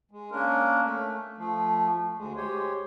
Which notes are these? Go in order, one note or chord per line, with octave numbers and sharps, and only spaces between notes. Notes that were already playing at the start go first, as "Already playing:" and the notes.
G#3
A#3 C#4 D4 A#4
A3
F3 A3
D2 G#3
G#3 G4 C5 C#5